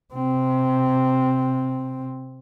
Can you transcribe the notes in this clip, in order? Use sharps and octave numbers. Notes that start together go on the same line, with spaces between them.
C3 C4